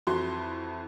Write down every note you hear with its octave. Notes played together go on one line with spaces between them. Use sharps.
F2 E3 E4 F#4 C6